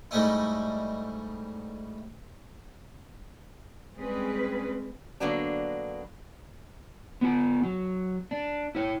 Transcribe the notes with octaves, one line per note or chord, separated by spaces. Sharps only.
G#2 G3 A3 C#4 D#4 E4
G3 G#3 C4 C#4 G#4 B4
D3 F#3 A#3 B3 D4
B3 F4
F#3
D4
E4 C#5